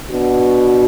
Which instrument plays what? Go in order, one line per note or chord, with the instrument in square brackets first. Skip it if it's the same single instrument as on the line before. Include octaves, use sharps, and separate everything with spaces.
[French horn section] B2 B3 D4 F#4